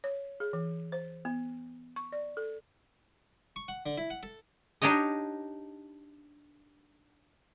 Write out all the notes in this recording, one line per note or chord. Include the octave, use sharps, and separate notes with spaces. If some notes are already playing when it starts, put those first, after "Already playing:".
C#5
G#4
E3
C5
B3
C#6
D5
A4
C#6
F#5
D3
E4
F#5
A4
D4 D#4 G4 C#5 D#5